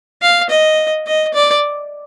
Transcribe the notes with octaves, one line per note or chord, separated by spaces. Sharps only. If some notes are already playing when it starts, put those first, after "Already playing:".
F5
D#5
D#5
D5